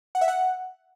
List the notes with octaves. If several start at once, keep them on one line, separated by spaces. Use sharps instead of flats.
F#5
E5
F#5